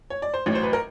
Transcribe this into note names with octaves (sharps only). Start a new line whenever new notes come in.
C#5
D5
C5
A1 A2 F#3 C#5
C5
B4
A#4